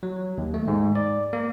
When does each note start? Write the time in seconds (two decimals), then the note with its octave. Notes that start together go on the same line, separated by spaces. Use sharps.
0.03 F#3
0.38 D#2
0.54 A3
0.68 G#2
0.95 D5
1.33 A#3